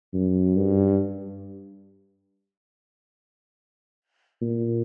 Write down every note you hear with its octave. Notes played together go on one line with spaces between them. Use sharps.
F#2
G2
A#2